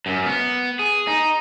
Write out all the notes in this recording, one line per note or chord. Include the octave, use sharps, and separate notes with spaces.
F#2
B3
G#4
D#4